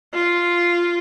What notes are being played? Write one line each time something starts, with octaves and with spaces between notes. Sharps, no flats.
F4